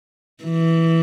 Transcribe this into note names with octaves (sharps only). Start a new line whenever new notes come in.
E3